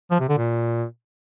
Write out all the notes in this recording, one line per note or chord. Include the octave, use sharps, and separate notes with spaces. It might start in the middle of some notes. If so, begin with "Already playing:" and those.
F3
C3
D3
A#2